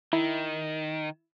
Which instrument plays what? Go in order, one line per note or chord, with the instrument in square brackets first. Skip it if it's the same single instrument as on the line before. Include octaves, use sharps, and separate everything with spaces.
[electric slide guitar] D#3 [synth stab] E4